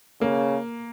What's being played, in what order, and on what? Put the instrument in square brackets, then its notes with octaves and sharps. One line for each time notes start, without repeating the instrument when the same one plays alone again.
[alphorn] C#3 [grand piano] A#3